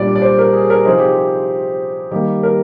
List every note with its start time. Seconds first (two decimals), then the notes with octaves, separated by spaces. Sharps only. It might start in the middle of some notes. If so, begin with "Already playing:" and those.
Already playing: A#2 G3 D4 D5
0.16 D5
0.22 C5
0.39 A#4
0.53 G#4
0.70 A#4
0.85 C3 F3 C4 D#4 G#4
0.98 G4
1.11 G#4
2.11 D#3 G3 A#3 G4
2.43 A#4